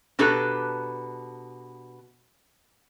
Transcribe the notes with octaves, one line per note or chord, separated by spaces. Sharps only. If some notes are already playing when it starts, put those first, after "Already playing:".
B2 D4 G4 A4 B4 A#5